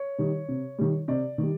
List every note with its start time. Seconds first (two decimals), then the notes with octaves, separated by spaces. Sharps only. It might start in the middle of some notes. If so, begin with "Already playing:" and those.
Already playing: C#5
0.18 D#3 G3
0.48 C3
0.78 D#3 G3
1.08 C3 D5
1.38 D#3 G3